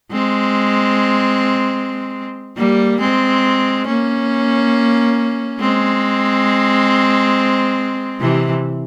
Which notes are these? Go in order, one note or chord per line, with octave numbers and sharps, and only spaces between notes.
G#3 C4
G3 A#3
G#3 C4
A#3 C#4
G#3 C4
C3 E3